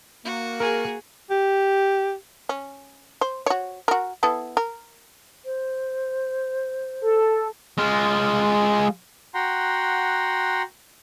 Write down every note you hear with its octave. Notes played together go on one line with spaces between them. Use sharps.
A#3 F#4
G#4 A#4
G4
C#4
C5
F#4 C#5
F#4 A#4
B3 E4 A4
A#4
C5
A4
G#3 F4
F#4 F#5 G5 A#5 C6